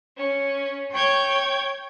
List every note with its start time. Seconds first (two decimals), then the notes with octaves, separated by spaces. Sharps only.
0.17 C#4
0.91 C#5 G5 G6 G#6